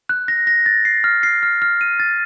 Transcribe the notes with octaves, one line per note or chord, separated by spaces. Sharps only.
F#6
A#6
A#6
A6
C7
F6
C7
F6
F6
D#7
A6